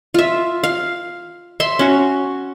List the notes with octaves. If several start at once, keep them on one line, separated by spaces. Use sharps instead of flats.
F4 E5
F5
E5 C6
C#4 F#4